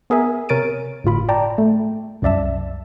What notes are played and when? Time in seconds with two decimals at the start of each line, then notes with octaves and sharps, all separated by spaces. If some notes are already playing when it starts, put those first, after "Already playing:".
0.10 B3 G#4 A#4 E5 G#5
0.49 C3 A#4 C#5 A6 D7 D#7
1.04 G1 A2 F4 B5
1.29 D5 G5 A5 A#5
1.58 A3
2.22 C2 F#2 D5 E5 A5